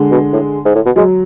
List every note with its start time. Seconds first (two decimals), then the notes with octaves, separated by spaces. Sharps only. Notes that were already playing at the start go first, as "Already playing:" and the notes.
Already playing: D3 G#3
0.11 B2
0.32 A2
0.65 G#2
0.75 A2
0.86 B2
0.96 F#3 G#3